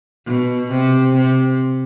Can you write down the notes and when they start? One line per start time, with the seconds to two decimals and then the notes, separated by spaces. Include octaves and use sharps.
0.26 B2
0.70 C3
1.15 C3